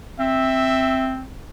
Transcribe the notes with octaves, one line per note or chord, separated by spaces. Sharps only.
C4 E5